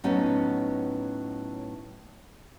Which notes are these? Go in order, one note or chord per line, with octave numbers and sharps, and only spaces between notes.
A2 F#3 B3 C#4 D#4